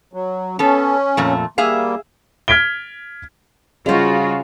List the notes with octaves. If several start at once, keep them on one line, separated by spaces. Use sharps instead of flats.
F#3
B3 C#4 A4
F2 A#2 A3
G3 A#3 G#4 E5 F5
F6 G#6 B6 D7 G7
C#3 G3 F4 F#4 G#4 C5 D#5